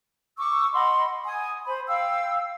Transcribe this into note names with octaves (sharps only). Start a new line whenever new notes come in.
C#6 D6 E6
D#5 F#5 B5 C6
G#5 D#6
C5 B5
F5 G5 E6